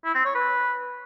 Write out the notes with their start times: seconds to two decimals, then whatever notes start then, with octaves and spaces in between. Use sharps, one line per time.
0.05 E4
0.15 C4
0.25 C#5
0.35 B4